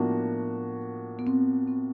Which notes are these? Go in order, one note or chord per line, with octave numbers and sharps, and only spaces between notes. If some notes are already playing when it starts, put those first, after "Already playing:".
Already playing: A2 F3 A#3 B3 D4 F#4
B3
C4
C4